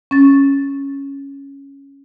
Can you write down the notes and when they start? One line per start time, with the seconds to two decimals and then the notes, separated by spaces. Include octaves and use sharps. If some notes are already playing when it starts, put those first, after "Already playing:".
0.11 C#4 A6